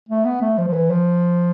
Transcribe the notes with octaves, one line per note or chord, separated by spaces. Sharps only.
A3
B3
A3
F3
F3
E3
F3